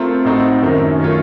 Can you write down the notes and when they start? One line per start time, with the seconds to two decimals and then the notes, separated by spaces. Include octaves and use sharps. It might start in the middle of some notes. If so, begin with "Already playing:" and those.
Already playing: A3 C4 F4 A#4
0.25 A2 A3 C4 D#4 F#4
0.62 F#2 D#3 A3 C#4
0.99 D#3 A3 C#4 F4